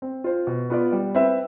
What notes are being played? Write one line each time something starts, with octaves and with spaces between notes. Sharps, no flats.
C4
F4 C5
B2
B3 F4 B4 D5
G3
C4 E4 B4 E5